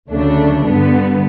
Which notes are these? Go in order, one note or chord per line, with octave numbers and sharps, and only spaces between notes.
D2 C#3 F#3 A3 D4
G2 D3 G3 B3